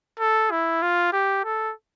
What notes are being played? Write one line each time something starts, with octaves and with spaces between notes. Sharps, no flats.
A4
E4
F4
G4
A4